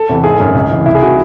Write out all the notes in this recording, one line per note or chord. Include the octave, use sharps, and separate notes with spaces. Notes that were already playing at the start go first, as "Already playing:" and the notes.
Already playing: A4
E2 C3 E3
G#1 G#4
F#2 D#3
C#2
C3 E3
C2 E4
G#4
C3 D#3 F#4